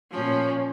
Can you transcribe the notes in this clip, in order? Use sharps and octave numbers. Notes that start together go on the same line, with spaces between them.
A#2 F3 C#4